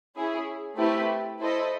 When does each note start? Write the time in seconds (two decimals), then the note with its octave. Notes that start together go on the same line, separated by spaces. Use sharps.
0.16 C#4 E4 G#4
0.78 A3 C4 E4 G4 B4
1.40 E4 A4 C5 D#5